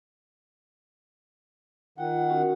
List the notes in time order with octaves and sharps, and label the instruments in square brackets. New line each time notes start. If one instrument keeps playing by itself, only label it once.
[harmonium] D#3 F#5 [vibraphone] F4 G5
[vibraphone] C#4 F#4 A#4